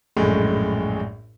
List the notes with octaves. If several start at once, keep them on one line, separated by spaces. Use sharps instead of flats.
A#1 F#2 A2 G#3